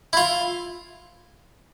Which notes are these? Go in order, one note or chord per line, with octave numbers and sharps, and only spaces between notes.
E4
F4